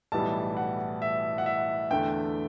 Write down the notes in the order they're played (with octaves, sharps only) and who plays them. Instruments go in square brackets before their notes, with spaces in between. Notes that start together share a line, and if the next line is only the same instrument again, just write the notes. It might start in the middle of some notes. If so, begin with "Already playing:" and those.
[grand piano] B1 A2 E3 G3 A5
F#5
E5
F#5
E5
E2 D3 A3 G5